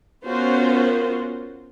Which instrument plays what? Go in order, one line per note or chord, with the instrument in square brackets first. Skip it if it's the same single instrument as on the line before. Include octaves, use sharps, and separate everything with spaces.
[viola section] B3 C#4 F4 F#4 A#4 C5